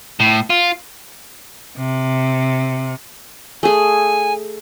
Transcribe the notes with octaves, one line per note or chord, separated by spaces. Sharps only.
A2
F4
C3
A3 G#4 G#5